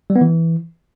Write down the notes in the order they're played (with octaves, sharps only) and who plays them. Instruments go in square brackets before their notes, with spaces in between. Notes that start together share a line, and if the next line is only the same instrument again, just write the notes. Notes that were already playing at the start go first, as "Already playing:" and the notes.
[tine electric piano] G3
B3
E3